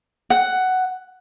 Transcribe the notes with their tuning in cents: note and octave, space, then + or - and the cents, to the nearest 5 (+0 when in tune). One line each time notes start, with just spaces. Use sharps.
F#5 +10